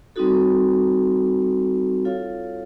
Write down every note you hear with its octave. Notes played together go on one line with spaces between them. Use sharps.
G3 C4 D#4 F#4 A4
F4 A4 C#5 F5